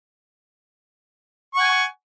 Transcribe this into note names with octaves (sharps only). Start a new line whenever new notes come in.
F#5 G#5 C#6